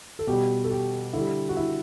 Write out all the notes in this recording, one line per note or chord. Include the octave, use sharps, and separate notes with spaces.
A4
B2 G3 G4
A4
G4
D3 G3 E4
F#4
E4